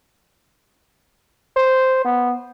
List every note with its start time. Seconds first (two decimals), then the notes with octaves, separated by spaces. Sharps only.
1.56 C5
2.05 B3